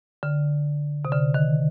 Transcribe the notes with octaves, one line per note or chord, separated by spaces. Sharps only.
D3
C3
D3
D#3